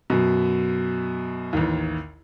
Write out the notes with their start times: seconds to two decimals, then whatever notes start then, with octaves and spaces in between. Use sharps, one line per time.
0.10 F#2 B2
1.53 A1 D#2